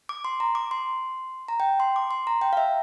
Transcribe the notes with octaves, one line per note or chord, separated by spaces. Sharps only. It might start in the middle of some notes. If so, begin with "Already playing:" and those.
D6
C6
A#5
D6
C6
A#5
G5
C6
D6
C6
A#5
G5
F5
E5